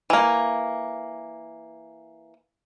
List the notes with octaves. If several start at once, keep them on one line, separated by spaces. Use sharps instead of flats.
E3 A#3